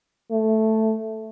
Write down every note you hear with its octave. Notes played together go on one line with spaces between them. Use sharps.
A3